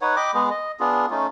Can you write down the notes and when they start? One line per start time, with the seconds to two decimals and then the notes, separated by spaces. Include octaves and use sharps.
0.01 D#4 B4 C#5 F#5
0.16 D#5 G5 B5 D6
0.34 G#3 B3 G#4
0.50 D#5
0.80 B3 D4 F4 G#4
1.11 A3 C#4 D#4 F4